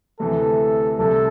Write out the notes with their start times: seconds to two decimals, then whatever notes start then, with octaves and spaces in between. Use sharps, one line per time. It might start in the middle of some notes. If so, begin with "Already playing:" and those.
0.20 D2 C3 E3 A4
0.99 C2 C3 G3 A4